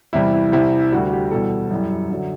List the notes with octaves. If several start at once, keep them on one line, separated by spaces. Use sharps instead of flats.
E2 C3 E3 G3 E4
E4
C2 C3 E3 G3 E4
D2 D3 G3 F#4
G4
E2 B2 G3 A4
F#2 E3 G3
F#2 D3 F#3